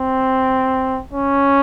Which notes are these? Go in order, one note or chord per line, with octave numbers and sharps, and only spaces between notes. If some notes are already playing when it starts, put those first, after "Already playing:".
Already playing: C4
C#4